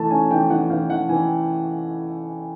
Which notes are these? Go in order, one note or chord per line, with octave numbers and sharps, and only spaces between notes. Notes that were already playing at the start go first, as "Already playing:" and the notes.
Already playing: E3 A3 A5
C#4 G#5
E3 G5
E3 F#5
E3 F5
E3 F#5
E3 G#5